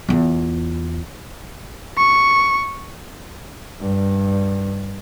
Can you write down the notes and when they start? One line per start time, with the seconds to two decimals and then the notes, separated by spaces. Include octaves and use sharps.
0.09 E2 F4
1.98 C#6
3.82 G2